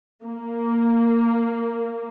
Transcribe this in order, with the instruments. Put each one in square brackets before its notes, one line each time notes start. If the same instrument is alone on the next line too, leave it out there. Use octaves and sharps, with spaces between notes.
[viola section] A#3